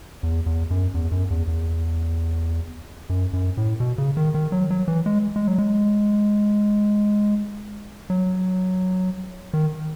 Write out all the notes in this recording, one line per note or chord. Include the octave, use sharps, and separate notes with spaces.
E2
E2
F#2
E2
F#2
E2
E2
F#2
F#2
A2
B2
C#3
D#3
D#3
F#3
F#3
E3
G#3
G#3
F#3
G#3
F#3
D#3